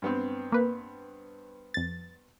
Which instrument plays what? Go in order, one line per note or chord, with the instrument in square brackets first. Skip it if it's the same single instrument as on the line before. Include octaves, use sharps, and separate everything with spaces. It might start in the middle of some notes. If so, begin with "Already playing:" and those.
[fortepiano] G2 B3 C4
[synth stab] A#3 B4
F2 A6